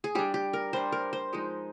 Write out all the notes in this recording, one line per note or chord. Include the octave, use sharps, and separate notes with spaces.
G#4
G3 D4 G4
G4
A#4
G3 D4 C5
A#4
C5
F3 G#3 D#4